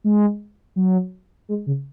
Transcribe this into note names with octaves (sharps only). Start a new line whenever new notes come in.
G#3
F#3
G#3
C#3